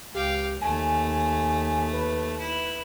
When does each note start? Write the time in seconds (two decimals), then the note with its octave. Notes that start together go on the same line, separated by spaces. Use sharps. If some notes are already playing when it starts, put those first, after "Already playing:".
0.15 C#2 G4 F5 G5
0.62 D#2 A3 G#5
1.93 B4
2.39 E4